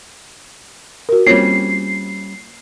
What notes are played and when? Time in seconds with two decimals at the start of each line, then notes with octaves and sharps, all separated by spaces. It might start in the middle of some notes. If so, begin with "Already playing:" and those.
1.09 F#4 A#4
1.27 G3 A#3 C4 C#4 F4 C#5 C7